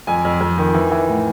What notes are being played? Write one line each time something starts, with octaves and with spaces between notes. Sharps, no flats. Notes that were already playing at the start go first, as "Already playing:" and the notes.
F2 G#5
F2
F2
D#3
E3
E3
A2